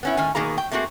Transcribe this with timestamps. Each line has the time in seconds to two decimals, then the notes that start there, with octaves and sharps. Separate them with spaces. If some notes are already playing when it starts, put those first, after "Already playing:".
0.03 B3 C#4 E4
0.17 A2 D#3 C#4 G#5
0.35 B2 D#3 A#3 G#4 A#5
0.58 G5
0.72 A3 A#3 C4 F#4 G#4